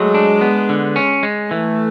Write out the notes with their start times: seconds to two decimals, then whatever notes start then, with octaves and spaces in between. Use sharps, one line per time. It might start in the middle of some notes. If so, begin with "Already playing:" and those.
Already playing: F#3 G#3 A3
0.14 D4
0.41 B3
0.69 D3
0.96 C#4
1.23 G#3
1.50 E3 A3